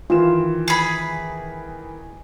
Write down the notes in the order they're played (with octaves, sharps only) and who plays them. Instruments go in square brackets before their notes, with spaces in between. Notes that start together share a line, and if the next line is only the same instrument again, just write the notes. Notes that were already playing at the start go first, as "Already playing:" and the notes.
[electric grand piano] D#3 E3 E7 [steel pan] F4
[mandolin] G#4 B5